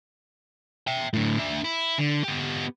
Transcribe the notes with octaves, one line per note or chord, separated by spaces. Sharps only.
E5 G5
A2 D3
D4 E5
E4
D3
B3 G4